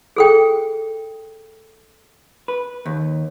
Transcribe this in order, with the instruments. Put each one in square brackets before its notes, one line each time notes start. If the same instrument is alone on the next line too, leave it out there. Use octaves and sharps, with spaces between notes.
[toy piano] G#4 A4 G5
[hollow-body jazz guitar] B4
D#2